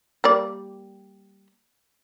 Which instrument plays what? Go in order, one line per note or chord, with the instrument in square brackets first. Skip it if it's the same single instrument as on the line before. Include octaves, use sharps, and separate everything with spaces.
[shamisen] G3 A#3 D5